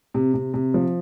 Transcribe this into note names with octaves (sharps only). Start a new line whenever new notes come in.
C3
C3
C3
F3